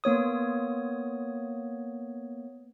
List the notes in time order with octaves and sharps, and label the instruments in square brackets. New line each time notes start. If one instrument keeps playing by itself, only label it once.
[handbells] A#3 B3 C#5 D#6